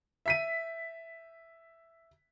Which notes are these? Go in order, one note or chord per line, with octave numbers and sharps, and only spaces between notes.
E5 B6 D#7